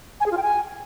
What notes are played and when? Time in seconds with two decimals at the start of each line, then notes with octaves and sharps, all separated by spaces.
0.20 G#5
0.26 G#4
0.31 F4
0.37 G5
0.43 G#5